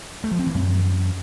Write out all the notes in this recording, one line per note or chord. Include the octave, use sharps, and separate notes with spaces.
A3
F3
C4
E3
F#2